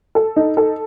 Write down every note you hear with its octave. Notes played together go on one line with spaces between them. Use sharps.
A4
D#4
A4